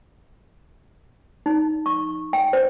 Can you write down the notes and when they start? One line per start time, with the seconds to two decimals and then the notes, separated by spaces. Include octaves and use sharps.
1.46 D#4
1.86 C#6
2.33 G5
2.53 C5